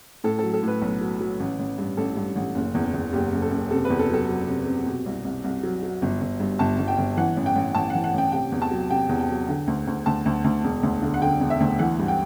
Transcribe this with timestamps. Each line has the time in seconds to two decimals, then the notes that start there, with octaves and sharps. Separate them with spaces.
0.24 A2 A4
0.39 F#3 A4
0.53 A4
0.63 A2 B4
0.82 B1
1.01 F#3
1.20 F#3
1.40 A1
1.59 A1
1.78 G2
1.97 A1 A4
2.17 G2
2.36 A1
2.55 F#1
2.75 E2
2.94 E2
3.13 F#1 G4
3.32 F#1
3.42 A4
3.51 F#1
3.71 C3 A4
3.85 B4
3.90 E2
3.99 A4
4.10 F#3 A4
4.29 F#3
4.48 C3
4.67 C3
4.86 B2
5.06 C2
5.25 C2
5.44 C2
5.63 F#3
5.83 F#3
6.02 G1
6.21 G1
6.40 G2
6.59 G1 A5
6.78 G1
6.88 G5
6.98 G1
7.17 E3 F#5
7.37 A1
7.46 G5
7.56 A1
7.75 A1 A5
7.90 E3 F#5
8.04 F#5
8.14 A1 G5
8.32 C3 G5
8.52 E2
8.62 A5
8.71 F#3
8.91 C3 G5
9.09 E2
9.20 G5
9.29 F#3
9.48 D3
9.67 D2
9.87 D2
10.06 D2 A5
10.25 D2
10.44 D2
10.64 E1
10.83 D2
11.02 D3
11.14 F#5
11.22 D3 G5
11.40 E1
11.50 E5
11.60 D2
11.79 E3 F#5
11.99 G2
12.08 G5